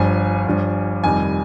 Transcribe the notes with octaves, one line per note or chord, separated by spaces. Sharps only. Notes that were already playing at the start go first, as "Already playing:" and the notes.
Already playing: G1 G2 F3 G#5
G1 G2 F3
F1 F2 D#3 G3 G#5